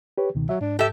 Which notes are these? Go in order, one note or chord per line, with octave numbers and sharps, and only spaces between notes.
G4 B4 C#5
C#2 B2 D#3
F#3 E5
G#2 D4
G4 A4 E5